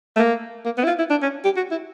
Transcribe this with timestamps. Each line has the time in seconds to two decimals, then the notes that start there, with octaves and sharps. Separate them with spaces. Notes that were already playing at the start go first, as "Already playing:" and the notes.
0.16 A3
0.19 A#3
0.65 A#3
0.77 B3
0.84 E4
0.87 F4
0.99 E4
1.10 D4
1.23 C#4
1.45 G4
1.57 F#4
1.71 E4